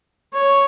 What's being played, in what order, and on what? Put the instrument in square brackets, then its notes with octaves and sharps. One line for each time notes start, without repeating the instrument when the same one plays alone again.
[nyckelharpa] C#5